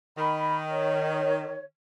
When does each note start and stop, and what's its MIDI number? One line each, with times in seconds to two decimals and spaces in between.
0.18 1.61 51
0.18 0.58 83
0.70 1.63 73